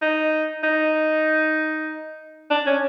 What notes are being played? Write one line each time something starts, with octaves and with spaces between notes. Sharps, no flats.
D#4
D#4
D4
C#4